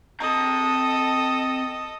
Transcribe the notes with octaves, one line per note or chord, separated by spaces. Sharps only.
C4 A4 D#5 A#5